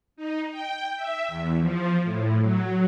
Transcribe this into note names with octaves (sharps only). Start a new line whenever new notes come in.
D#4
G5
E5
E2
F3
A2
F#3